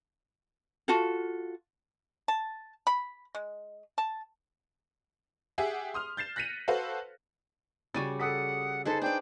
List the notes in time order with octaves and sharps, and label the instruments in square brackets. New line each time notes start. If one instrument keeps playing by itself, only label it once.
[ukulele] F4 F#4 A4
[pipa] A5
B5
G#3
A5
[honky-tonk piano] G4 G#4 E5 F#5 G#5
C6 D#6 F6
G6 A6 C7 E7
F#6 A#6 B6 C#7 D#7 F7
F#4 A4 B4 C5 F5
[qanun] C#3 G3 F#4 [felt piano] A6 D#7
[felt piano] A4 D#6 B6 [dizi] F#5
[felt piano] D#4 [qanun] G#4 B4 C5 [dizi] A4
[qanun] D4 D5 [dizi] G5